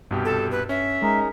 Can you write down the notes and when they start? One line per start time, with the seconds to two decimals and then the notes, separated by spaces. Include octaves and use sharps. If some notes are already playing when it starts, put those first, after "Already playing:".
0.11 C2 G2 B2 G4
0.25 A4
0.51 B4
0.69 C#4 E5
1.02 G#3 D#4 G#4 A#4